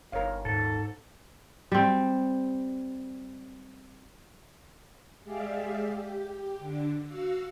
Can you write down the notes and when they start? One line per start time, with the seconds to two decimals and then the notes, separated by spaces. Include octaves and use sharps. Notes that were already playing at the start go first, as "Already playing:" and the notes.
0.12 G1 A#4 C#5 F5
0.45 D#1 G#2 A4
1.72 G3 C4
5.23 G#3 G4 G#4 D5 E5 F5
5.87 G4
6.59 D3 D4
7.03 F#4 F5 E6